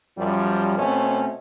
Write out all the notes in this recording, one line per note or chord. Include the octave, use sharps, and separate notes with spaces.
F#2 F3 G3
B2 A3 C4 C#4